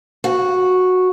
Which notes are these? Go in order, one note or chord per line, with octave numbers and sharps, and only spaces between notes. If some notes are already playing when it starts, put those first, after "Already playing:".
F#4